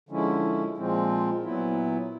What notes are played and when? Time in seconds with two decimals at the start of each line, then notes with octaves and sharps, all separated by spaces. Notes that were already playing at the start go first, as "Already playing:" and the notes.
0.09 D3 F3 G#3 C#4 E4
0.77 A#2 F3 G#3 C4 F4
1.44 A#2 F#3 B3 E4